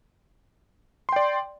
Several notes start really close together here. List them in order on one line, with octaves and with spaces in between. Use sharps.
C6 G5 D5